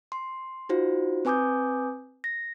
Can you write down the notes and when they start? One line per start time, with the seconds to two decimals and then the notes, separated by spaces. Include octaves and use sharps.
0.12 C6
0.69 D#4 F4 F#4 C5
1.25 C4 B4 G#5 D6 D#6 G6
2.24 A#6